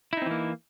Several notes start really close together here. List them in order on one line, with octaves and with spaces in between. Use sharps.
E4 D#4 C4 E3 A#3